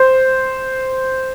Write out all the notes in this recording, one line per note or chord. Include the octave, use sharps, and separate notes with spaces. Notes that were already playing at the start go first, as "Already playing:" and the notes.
Already playing: C5